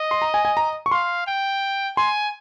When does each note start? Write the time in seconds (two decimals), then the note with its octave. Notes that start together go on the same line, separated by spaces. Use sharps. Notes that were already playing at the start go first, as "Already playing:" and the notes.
Already playing: D#5
0.11 C6
0.22 A#5
0.34 G#5
0.45 G#5
0.57 A#5
0.86 C#6
0.91 F5 C6
1.27 G5
1.97 G#5 C6